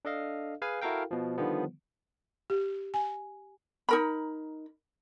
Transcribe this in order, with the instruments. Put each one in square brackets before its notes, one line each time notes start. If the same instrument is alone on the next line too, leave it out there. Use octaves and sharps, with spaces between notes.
[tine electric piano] D4 A4 D#5 F5
G#4 B4 F5 G#5
E4 F#4 A4 A#4 F5 G5
B2 F3
D3 D#3 F3 G3 B3
[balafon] G4
G#5
[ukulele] D#4 A#4 B5